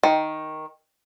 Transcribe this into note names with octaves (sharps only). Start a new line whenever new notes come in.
D#3